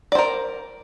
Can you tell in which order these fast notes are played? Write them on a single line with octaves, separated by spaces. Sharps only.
D5 C5 A#4